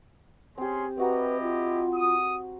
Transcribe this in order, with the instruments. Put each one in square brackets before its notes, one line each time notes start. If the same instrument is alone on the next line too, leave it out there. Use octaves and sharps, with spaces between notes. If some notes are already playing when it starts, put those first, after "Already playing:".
[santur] C4 G4 [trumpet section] C#4 G#4 C6
[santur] C4 F#4 A#5 [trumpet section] E4 G4 D#5 [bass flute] B4
[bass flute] F4
[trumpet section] D#6